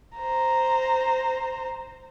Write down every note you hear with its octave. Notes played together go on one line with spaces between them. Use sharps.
C5 A#5